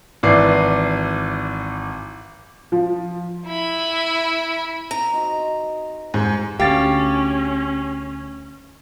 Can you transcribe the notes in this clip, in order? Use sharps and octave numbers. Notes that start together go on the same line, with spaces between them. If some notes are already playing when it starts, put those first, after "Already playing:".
G#1 E3 D5 D6 C7
F3
E4 B5
A#5
C4 D#4 F#4
G#2 F#4 G4 C5
D2 C#4 G4 F5 A6